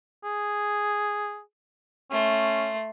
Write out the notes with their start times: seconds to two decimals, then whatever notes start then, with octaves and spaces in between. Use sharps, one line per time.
0.24 G#4
2.11 A3 C#4 C6